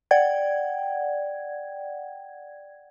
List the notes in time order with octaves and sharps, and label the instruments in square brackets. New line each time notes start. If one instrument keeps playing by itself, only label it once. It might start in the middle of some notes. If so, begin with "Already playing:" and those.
[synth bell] D5 F#5 G5 G#6